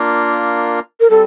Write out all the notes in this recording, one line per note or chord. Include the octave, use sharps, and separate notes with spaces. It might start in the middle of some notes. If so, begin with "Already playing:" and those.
Already playing: A#3 D4 F4 A#4
A#4
G3 C4 A4